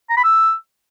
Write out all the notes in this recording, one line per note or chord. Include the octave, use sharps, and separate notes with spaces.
A#5
B5
E6